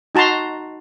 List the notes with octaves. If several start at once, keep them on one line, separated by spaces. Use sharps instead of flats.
D#4 F#4 A5 A#5 C6